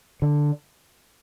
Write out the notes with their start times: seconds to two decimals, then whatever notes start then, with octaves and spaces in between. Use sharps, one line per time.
0.22 D3